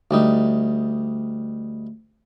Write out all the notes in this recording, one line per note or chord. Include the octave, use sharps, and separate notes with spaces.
D2 G3 D#4